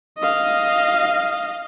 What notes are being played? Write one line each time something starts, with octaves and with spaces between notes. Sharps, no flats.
D#5 F5